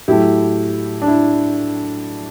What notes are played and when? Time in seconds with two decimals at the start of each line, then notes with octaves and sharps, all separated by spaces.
0.08 A2 F#3 A3 E4 G4
1.02 D4
1.08 E4